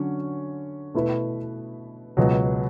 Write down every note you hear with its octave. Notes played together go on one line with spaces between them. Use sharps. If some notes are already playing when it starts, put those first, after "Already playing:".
Already playing: D3 F#3 C#4
B2 A3 E4 B4
C#2 B2 F#3